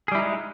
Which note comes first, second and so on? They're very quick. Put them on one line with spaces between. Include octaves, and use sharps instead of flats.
G#4 G3 E4 D#4 G#3